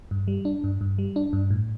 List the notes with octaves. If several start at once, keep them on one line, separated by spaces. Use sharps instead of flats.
G2
G3
D4
G2
G2
G3
D4
G2
A2